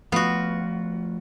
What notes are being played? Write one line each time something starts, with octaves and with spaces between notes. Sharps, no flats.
F3 A3 B3 F4 F#4